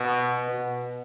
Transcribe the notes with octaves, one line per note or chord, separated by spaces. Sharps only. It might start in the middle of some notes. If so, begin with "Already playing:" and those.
Already playing: B2
B2